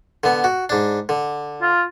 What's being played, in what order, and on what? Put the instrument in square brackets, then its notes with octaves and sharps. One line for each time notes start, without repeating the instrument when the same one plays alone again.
[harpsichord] D3 B3
F#4
G#2 D4
D3
[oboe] F4